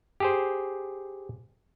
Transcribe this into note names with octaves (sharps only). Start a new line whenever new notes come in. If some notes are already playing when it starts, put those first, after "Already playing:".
G4 G#4 C5